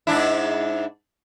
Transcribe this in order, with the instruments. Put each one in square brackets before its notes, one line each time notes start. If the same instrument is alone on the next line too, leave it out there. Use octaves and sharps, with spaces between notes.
[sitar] G#2 D4 E4